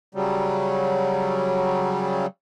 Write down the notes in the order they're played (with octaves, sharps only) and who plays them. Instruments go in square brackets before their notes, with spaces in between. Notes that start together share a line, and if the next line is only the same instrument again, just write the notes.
[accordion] C#3 F#3 G3